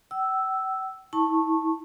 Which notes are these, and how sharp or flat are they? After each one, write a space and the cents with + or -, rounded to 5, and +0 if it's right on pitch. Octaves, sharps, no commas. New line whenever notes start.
G5 -45 E6 +0
E4 -35 A5 +0 C#6 -15